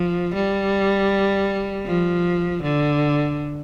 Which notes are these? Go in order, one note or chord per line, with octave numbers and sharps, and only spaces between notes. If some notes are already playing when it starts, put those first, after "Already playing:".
Already playing: F3
G3
F3
D3